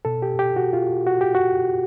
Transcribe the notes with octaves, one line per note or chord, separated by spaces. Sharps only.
B2 A4
G4
G4
F#4
F4
F#4
G4
F#4